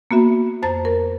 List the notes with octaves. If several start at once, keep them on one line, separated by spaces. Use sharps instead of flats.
A#3 B3 F#4 E5
F2 C5 A5 A#5 A6
A#4